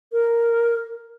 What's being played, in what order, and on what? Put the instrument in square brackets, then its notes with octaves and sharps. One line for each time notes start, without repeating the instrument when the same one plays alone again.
[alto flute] A#4